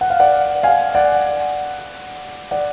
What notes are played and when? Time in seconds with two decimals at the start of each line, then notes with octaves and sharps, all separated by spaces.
0.01 F#5
0.10 F5
0.20 D5 F#5
0.63 F5 G#5
0.95 D5 F#5
2.51 D5 F#5